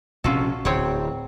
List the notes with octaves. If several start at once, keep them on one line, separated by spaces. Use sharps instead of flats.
A#1 C3 C#4 F4 F#4 A4
D1 C4 C#5 F#5